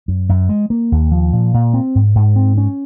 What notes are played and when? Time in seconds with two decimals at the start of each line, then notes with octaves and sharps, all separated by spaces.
0.08 F#2
0.29 F#2
0.49 G#3
0.70 A#3
0.92 D#2
1.11 F3
1.33 A#2
1.54 A#2
1.74 C4
1.95 G#2
2.15 G#2
2.36 C4
2.58 C#4